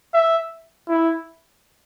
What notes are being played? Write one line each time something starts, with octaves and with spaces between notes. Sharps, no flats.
E5
E4